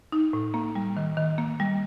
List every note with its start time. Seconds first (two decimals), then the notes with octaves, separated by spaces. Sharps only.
0.12 D#4
0.33 A2
0.54 A#3
0.75 G3
0.97 D#3
1.17 D#3
1.38 A#3
1.60 G3